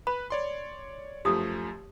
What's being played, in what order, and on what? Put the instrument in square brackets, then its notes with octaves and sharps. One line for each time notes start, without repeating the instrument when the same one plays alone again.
[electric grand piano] B4 [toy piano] B5
[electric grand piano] C#5 D5 C6
[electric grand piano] F#2 F3 A3 [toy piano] G4 D#6